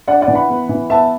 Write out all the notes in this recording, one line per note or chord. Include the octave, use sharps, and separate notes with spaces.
D4 D5 F#5
D5 F#5
E3
F#5 B5
B3
E3
B3 E5 A5